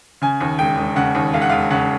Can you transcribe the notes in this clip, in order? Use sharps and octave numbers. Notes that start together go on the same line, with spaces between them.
C#3 G#5
D#2
E1 G5
E1
C#3 F#5
D#2
E1 F5
F#5
E1 F5
C#3 F#5